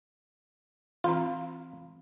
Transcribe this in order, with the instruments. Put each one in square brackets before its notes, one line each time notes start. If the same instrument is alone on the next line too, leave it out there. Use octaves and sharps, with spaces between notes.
[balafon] E3 C4 A#5 [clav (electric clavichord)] F4